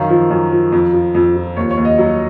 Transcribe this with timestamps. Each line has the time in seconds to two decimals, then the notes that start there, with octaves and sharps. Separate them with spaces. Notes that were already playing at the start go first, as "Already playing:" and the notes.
Already playing: F#2 D#3 F5
0.10 F3
0.30 F#2
0.52 F3
0.72 F2
0.93 F3
1.15 F2
1.36 F3
1.56 D#2 C#5
1.71 C#5
1.77 D#2
1.85 D#5
1.98 F#3